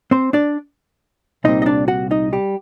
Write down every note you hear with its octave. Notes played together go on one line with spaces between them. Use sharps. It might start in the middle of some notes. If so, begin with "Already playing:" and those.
C4 C5
D4 D5
C2 A#2 G3 C4 D#4 D#5
D#5
D4 D5
F#4 F#5
D#4 D#5
G3 G4